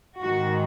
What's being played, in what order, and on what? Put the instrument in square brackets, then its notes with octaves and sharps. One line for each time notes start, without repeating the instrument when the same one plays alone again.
[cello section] G#2 D#3 F#4